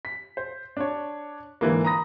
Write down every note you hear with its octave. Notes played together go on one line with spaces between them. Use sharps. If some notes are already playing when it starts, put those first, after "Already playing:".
B6
C5
D4 C#5
G#2 D3 E3 A#3
A#5 B5 D#6 A#6